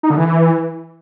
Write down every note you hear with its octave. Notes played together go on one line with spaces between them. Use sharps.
D#4
D3
E3